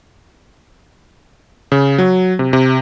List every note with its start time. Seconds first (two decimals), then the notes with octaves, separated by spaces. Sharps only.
1.72 C#3
1.98 F#3
2.39 C3
2.53 C3